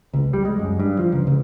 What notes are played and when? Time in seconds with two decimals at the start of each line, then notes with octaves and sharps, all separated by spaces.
0.14 C#2
0.33 G3
0.45 G#3
0.59 F#2
0.79 G2
0.99 F3
1.12 C#2
1.27 C#2